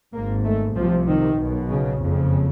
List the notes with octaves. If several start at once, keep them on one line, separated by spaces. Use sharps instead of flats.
G#1 G#2 A#3
A3
C2 C3 F3
D#3
B1 B2
C#3
F#1 F2 C#3